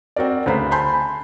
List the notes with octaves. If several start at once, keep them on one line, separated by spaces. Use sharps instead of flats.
C4 F#4 A#4 D5
D2 C#3 B4 C5 A#5 B5
G#5 A5 B5 C6 G6